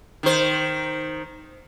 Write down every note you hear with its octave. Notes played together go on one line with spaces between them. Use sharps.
D#3 C5